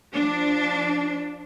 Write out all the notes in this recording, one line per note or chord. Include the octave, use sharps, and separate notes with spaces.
F3 D4